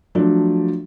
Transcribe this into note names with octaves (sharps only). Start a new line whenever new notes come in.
F3 F#3 A3 D4